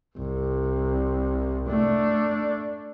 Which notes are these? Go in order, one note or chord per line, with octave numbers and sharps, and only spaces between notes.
C2
A3 D4